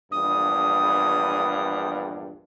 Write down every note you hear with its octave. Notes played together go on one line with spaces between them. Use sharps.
A#1 E2 G2 D#6